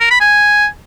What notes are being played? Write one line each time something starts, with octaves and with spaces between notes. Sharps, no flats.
A#4
B5
G#5